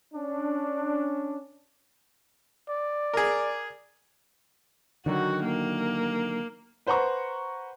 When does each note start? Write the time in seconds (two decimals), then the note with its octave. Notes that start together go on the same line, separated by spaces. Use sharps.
0.14 C#4 D4
2.69 D5
3.14 G#4 A#4
5.06 D3 D#3 F#3 F#4
5.44 A#3
6.86 B4 C5 F#5 A#5 C#6